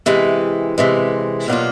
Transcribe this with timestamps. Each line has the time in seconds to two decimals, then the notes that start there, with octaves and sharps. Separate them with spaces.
0.06 C3 E3 G#3
0.78 C3 E3 G#3
1.48 B2 F#3 A#3 D4 F4